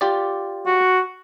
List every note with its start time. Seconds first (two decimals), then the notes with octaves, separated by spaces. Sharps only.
0.01 F4 G4 D5
0.66 F#4